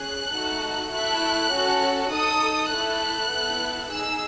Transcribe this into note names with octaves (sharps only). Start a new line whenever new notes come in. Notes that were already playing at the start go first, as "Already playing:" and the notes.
Already playing: C#4 G#4 F#6
A3 D#4 F#4 A4
A3 E4 A4 F#6
C#4 F#4 A4
D#4 A4 D#6
A3 E4 A4 F#6
B3 E4 A4
D#4 G#4 E6